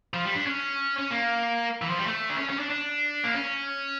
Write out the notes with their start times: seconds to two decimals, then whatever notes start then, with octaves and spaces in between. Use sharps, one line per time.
0.14 F3
0.25 G3
0.35 D4
0.46 C#4
0.98 C#4
1.10 A#3
1.82 E3
1.90 F3
1.98 G3
2.06 A3
2.29 D4
2.38 C#4
2.49 C#4
2.59 D4
2.70 D4
3.24 A#3
3.34 C#4